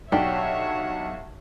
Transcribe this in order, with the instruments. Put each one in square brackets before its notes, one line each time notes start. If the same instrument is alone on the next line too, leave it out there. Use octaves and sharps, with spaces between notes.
[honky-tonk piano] B1 [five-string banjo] D4 G4 [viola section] C#5 E5 [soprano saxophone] F#5